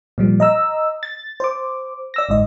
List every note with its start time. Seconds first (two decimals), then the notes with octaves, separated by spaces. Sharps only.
0.18 A#2 F3 G3
0.40 D#5 A#5 E6
1.03 A6
1.40 C5 D6
2.14 D5 E6 A#6
2.29 G1 G#2 D#5